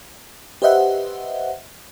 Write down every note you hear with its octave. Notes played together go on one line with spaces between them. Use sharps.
G4 B4 C5 D#5 E5 F#5